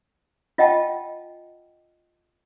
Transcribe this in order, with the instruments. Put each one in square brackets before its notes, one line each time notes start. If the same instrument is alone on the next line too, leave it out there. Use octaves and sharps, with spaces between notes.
[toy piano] F4 D#5 F#5 G5 A5